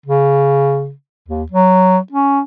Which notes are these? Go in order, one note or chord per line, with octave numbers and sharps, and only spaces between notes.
C#3
D#2
F#3
C#4